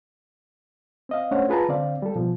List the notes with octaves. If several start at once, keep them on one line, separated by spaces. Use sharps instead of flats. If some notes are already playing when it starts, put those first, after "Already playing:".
C4 D#5 F5
A3 C#4 D4 C5 C#5 F#5
F4 G#4 B4 A5 A#5
D3 C4 D5 F5
G3 A4
B2 F3